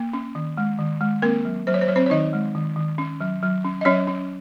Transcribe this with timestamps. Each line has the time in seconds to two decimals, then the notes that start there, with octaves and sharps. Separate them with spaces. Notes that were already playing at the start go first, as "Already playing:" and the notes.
Already playing: A#3
0.13 C#4
0.35 D#3
0.57 G#3
0.79 D#3
1.01 G#3
1.22 A#3 C4 A#4
1.45 F#3
1.67 F#3 C5
1.74 C#5
1.81 C5
1.88 F#3 C#5
1.96 C4 C5
2.06 C#5
2.10 D#3 D#4 D#5
2.33 G#3
2.55 D#3
2.76 D#3
2.98 C#4
3.21 F#3
3.43 F#3
3.65 C#4
3.81 D#5
3.85 F#3 C#4 C#5
4.07 C#4